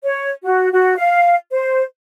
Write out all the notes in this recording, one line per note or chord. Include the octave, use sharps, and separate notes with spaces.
C#5
F#4
F#4
F5
C5